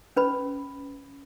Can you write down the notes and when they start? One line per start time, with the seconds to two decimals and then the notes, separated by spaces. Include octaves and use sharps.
0.16 C#4 B4 B5